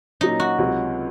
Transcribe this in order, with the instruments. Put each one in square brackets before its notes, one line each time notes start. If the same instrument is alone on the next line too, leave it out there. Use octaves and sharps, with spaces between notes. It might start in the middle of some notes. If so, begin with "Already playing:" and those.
[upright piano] A#2 F#3 C#4 [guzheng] D#4
[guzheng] F#4
[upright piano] C#2 C3 F#3 C#4 F4